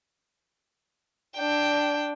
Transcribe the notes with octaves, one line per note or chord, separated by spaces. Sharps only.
D4 G5